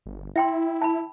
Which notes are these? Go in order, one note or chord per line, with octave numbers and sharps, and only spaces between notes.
G1
E4 E5 G5 C6
A5 B5